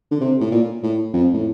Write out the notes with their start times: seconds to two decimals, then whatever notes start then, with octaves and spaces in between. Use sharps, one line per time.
0.11 D3
0.21 C3
0.41 A2
0.51 A#2
0.83 A2
1.13 F2
1.34 A2